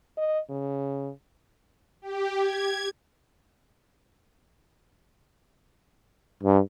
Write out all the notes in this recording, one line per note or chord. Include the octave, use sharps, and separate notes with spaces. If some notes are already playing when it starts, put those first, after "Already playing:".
D#5
C#3
G4
G#6
G2